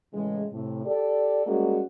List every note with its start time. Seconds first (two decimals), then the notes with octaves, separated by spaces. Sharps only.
0.14 A2 C#3 E3 G#3
0.52 A2 C3
0.85 G4 A4 D5
1.46 G3 G#3 A#3 C#4 F#4 G#4